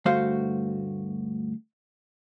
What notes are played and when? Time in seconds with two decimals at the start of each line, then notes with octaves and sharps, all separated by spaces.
0.06 D2 G2 A3 F#4 C5 F5